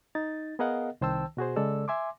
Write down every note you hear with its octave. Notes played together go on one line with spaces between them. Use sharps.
D#4 A6
B3 G#4 A#4 D#5 F5 F#5
C2 D#3 C5 G5 A5 E6
B2 F#4 G#4 C5
C#3 G#3 A4 D5 E6
E5 G#5 C6 D6